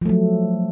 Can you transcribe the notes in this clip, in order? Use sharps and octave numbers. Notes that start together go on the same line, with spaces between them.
F3 F#3 A3